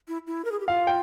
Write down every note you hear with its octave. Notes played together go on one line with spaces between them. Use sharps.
E4
E4
A#4
G#4
G4
F4 F5
G5